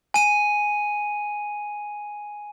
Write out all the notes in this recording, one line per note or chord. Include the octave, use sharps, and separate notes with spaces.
G#5 D#7